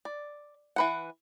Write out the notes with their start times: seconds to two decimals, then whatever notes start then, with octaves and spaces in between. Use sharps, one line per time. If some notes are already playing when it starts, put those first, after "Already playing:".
0.05 D5
0.76 E3 B4 F#5